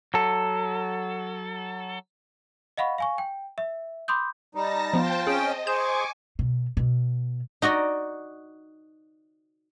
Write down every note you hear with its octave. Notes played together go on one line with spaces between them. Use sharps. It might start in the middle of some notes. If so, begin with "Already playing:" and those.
F#3 A4
D#5 F5 F#5 B5 C#6
F5 G#5 C#6
G5
E5
B5 C6 D6 D#6 G6
G3 D#4 A5 A#6
F3 B3 F4 C5 G5 A5
C4 C#4 G#4 D#5 G5
G#4 C5 G#5 C#6 D6 G6 E7
B2
B2
D#4 F#4 D5 D#5